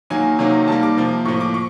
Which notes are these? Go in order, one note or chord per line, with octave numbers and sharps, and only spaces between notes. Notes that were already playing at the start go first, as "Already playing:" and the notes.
D#3 F#3 A#3 G#5
C3 D#3 F#3 A#3
D#3 G3 A#3 A5
D6
C3 F3 A#3
A2 F3 A#3 C#6
D6
C#6